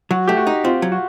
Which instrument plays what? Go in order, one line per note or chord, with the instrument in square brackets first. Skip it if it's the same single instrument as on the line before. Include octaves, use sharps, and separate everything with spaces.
[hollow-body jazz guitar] F#3 [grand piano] F#4
[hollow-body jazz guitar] A3 [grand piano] G4
[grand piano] F#4
[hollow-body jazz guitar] D#4
[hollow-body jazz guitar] C4 [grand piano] F4
[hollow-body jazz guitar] F#3
[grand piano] F#4